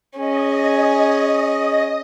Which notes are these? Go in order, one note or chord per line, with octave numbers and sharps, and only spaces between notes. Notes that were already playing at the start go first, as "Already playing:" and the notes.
C#4 G#4 D#5